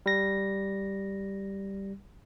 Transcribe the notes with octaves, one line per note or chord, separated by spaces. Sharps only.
G3 A#6